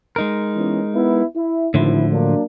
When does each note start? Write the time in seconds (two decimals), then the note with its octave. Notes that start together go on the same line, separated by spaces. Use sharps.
0.16 G#3 D#4 A#4
0.56 E3 B3 C#4
0.94 B3 E4
1.35 E4
1.74 G#1 A2 D3 F3 E4
2.12 F#3 A#3 D4